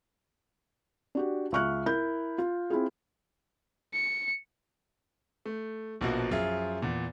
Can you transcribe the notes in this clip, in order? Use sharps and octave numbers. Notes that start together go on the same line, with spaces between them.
D4 F#4 G4
C#2 E5 C#6 F6 F#6
E4 A#4 G6
F4
C4 E4 F4 G#4
C#7
A3
A#1 B2 F3 A#3 F#4
F#2 F3 F4 G#4 E5
E2 A#2